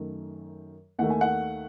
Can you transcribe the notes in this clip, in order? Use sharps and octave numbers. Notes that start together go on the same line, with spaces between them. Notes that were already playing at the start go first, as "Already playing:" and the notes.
Already playing: F#2 D#3 A3
D#2 D#3 A3 F#5
G#5
F#5